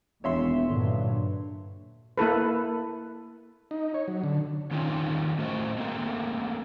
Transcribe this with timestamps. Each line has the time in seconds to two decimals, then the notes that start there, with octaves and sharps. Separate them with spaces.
0.24 E1 D#2 E3 C#5 E5 C6
0.67 G2 A#2 D3 F#3
2.18 A#3 E4 A4 B4
3.71 D#4
3.94 C#5
4.08 F#3
4.24 D3
4.71 D#3 C4 C#4 D#4 F4
5.38 A2 A3 F#4 C5 D#5
5.78 A3 A#3 C4